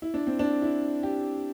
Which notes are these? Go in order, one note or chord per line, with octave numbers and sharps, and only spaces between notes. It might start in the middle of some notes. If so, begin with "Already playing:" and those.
E4
D4
C4
D4
E4
G4